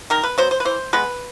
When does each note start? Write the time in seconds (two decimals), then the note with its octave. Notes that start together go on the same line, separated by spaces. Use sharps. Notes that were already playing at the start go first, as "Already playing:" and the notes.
0.10 D#3 A#4
0.23 B4
0.38 F#3 B3 C5
0.51 C5
0.60 B4
0.65 E3 C5
0.93 G#3 B3 B4